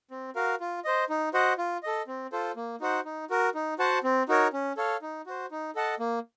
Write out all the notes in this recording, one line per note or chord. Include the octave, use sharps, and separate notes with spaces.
C4
F#4 A#4 F5
F4
C5 D#5
D#4
F#4 C5 D#5 F#5
F4
A4 D#5
C4
F4 A4 C5
A#3
D#4 F#4 C5 F#5
D#4
F#4 A#4
D#4
F#4 C5 F#5 A5
C4
D#4 F#4 A#4 C#5
C#4
A4 C#5 F5
D#4
F#4 C5
D#4
A4 D#5 F#5 A5
A#3